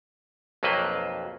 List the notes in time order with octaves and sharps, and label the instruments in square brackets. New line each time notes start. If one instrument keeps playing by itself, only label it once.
[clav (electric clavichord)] B1 F2 F#3 A#3 B4 C5